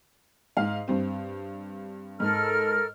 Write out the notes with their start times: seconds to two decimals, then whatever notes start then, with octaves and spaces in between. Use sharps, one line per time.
0.57 G#2 F5
0.88 G2 C4
2.20 G#2 A4 A#4 F6